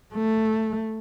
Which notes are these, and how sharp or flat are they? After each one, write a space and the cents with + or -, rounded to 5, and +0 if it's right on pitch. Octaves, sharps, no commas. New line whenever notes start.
A3 +5